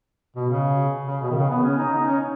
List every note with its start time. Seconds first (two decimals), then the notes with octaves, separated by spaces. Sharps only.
0.36 B2
0.50 C#3
1.07 C#3
1.22 B2
1.31 D#3
1.36 C#3
1.50 B3
1.64 C#4
1.78 D#4
1.93 D#4
2.07 C#4